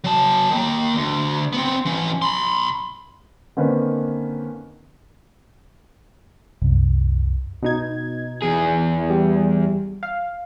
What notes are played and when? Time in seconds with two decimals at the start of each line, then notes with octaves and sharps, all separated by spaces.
0.04 F#3 A5
0.50 D#3 A#3
0.95 D2
1.53 B3 C4
1.85 E3 C#4
2.22 B5 C6
3.57 D3 D#3 A#3 C4 C#4 B4
6.62 C2 F#2
7.63 B2 D#4 G#6
8.42 E2 G#4
9.10 G3
10.03 F5